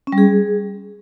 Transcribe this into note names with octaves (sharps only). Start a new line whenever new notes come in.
C#4
G3
G#4